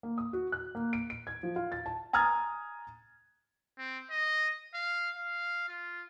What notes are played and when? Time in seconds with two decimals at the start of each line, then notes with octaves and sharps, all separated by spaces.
0.03 A#3
0.18 D#6
0.33 F#4
0.52 F#6
0.75 A#3
0.93 D7
1.10 D7
1.27 G#6
1.43 F3
1.56 F4
1.72 A6
1.86 A5
2.13 G#5 A#5 D#6 F6 G#6 A6
3.78 C4
4.11 D#5
4.74 F5
5.16 F5
5.69 F4